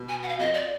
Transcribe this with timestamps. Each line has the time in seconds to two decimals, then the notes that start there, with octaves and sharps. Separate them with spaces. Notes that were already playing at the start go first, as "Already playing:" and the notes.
Already playing: B2
0.09 G#5
0.23 F#5
0.28 F5
0.39 F2 D#5
0.54 D5